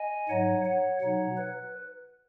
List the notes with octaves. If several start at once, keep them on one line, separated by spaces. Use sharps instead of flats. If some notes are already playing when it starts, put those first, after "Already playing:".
Already playing: D#5 G#5
G#2 F#3 D#4 C#5 F#5
C#5 F#5
B2 F#3 D#4 C#5 F#5
B4